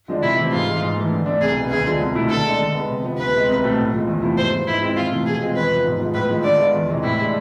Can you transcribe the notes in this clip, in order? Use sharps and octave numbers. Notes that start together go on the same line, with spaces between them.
D3 F3 G#3 D4
C3 E4
E3 A3 C4
G#2 F4
E3 G#3
G#2
E3 A3
D3
A3 D4
C2 G#4
B2 B3
D2 G#4
D3 F3 G#3
C2
B2 A3 E4
D3 A4
G#3 D4
D3
G#3 B3
C3
F3 B3
D2 B4
C3 G#3
C2
B2 A3 C4
A2
F3 G#3
E2
C3 F3 A3 E4
G#2 C5
F3 B3
G#2 E4
G#3 C4 E4
F2 F4
C3 E3 A3 E4
B2 G#4
G#3 C4 F4
E2 B4
C3 F3
G#2
F3 G#3 B3
A2 B4
F3 G#3
D3 D5
G#3 B3 F4
E2
C3 E3 G#3
A2 E4
G#3 D4